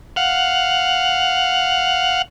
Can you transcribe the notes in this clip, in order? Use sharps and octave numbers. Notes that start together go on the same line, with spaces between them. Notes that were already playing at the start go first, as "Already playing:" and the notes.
F5 F#5